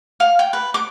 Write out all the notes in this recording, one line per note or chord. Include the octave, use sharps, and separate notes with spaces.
F5
G5
B4
D6